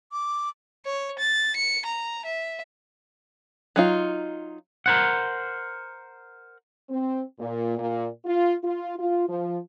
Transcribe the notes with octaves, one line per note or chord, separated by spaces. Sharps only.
D6
C#5
A6
C#7
A#5
E5
F#3 D#4 F4
A#4 C5 F#5
C4
A#2
A#2
F4
F4
F4
F3